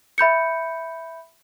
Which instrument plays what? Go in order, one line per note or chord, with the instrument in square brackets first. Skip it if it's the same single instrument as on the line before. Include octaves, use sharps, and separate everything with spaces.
[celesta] E5 B5 G6 C#7